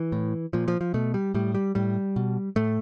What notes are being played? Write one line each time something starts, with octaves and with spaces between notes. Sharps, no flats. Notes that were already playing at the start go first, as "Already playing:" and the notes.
Already playing: E3
A2
A#2 F3
F3
F3
B2 A3
G3
A2 G3
G3
A2 G3
B2
A2 A3